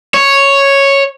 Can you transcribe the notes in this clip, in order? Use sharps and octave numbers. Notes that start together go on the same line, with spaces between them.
C#5